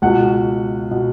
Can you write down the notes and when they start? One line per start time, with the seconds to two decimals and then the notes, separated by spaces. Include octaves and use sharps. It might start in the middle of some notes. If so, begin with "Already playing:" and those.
0.02 C#2 B2 F#5
0.91 B2